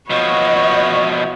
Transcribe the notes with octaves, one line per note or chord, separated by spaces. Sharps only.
B2 F3 F#4 B4 C#5 D#5